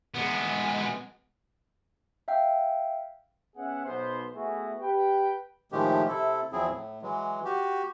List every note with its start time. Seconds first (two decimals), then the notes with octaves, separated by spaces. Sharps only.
0.14 G#3 B3
2.28 E5 F5 G5
3.56 B3 C#4 G#4 E5 F#5
3.85 B1 B3 C5
4.35 A3 B3 E4 F#4 G#4
4.81 G4 B4 G5
5.72 A2 D#3 F3 G#3 A3 G4
6.08 C3 E4 A4
6.52 E2 F3 F#3 C4 E4 G#4
6.69 A2
7.02 E3 F#3 G#3
7.45 F#4 G4